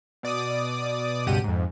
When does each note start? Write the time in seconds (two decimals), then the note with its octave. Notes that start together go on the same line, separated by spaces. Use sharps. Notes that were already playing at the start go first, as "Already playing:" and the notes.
0.23 B2 D5 D6 D#6
1.27 C#2 G2 B2 G4 F#5 D#7
1.44 F2 G#2